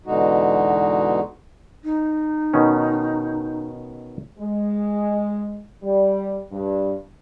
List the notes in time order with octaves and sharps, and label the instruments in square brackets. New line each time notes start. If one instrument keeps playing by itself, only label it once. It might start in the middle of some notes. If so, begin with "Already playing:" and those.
[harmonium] E2 B2 D3 G#3 D#4 F#4
[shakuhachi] D#4
[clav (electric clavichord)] B2 D#3 C#4
[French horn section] G#3
G3
G2